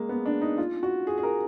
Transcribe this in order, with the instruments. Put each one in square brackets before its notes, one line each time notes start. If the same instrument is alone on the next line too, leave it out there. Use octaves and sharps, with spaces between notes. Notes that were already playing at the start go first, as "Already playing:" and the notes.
Already playing: [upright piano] G#3 A#3
B3
D4
D#4
F4
F#4
G#4
G#4
A#4